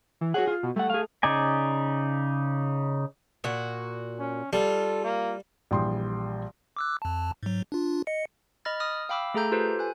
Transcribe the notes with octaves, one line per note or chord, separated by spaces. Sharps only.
E3
F#4 G#4 C#5 F#5
F4
B2
G3 A3 F#5
G#4 F5
C#3 D#4 D5 G#5
A#2 F#4
C#4
G3 F4 A4
A#3
A#1 E3 G3 G5 C6 D#6
D6 E6 F#6
F2 A5
G#2 F#3
D4 F4
D#5 C#7
D#5 B5 F6 A6
D#6 F6
F5 G5 B5 D6 E6
A3 G#4 A4 A#5 G6
F4 G4 A4 B4 C5
G#5 F#6